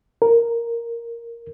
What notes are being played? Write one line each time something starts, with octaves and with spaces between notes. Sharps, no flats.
A#4